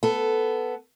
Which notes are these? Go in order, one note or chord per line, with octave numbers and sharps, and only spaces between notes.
B3 A4